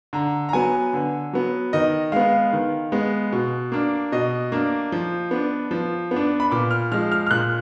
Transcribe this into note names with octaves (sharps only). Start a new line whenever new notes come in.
D3 A#5
A#5
F#3 B3 G#5
D3
F#3 B3
D#3 D#5
G#3 B3 F5
D#3
G#3 B3
B2
A#3 D4
B2 D#5
A#3 D4
F3
B3 D4
F3
B3
D4
B5
A#2 D6
F6
F3 G#3 F6
F6
F6
A#2 F#6